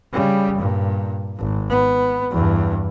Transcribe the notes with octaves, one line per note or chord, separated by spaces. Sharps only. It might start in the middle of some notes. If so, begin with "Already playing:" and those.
C#3 G3
G2 A#2
G#1
B3
E2 G2